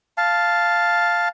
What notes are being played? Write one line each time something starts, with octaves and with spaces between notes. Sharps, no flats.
F5 A5